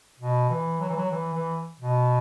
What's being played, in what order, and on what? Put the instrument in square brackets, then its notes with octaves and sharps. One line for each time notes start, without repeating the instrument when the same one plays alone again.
[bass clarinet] B2
E3
F#3
E3
F#3
E3
E3
B2